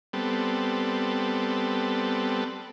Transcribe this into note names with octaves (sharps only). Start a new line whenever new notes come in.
G3 B3 C4 A4